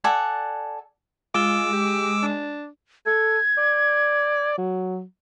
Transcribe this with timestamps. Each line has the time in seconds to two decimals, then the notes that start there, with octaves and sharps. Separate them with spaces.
0.04 A4 D5 F#5 G#5
1.34 G#3 F4 D6 E6
1.73 G4
2.22 D4
3.06 A4 G#6
3.58 D5
4.58 F#3